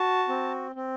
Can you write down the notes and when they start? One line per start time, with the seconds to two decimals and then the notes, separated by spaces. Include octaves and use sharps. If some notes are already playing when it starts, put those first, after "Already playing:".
Already playing: F#4 A5
0.29 C4
0.76 C4